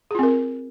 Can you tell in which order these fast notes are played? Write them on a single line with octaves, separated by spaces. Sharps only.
G#4 F4 C4 A#4